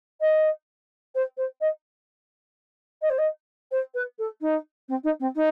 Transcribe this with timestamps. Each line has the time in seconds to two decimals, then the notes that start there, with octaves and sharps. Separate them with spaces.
0.20 D#5
1.14 C5
1.37 C5
1.60 D#5
3.01 D#5
3.09 C5
3.18 D#5
3.71 C5
3.94 B4
4.18 A4
4.41 D#4
4.88 C4
5.03 D#4
5.19 C4
5.35 D#4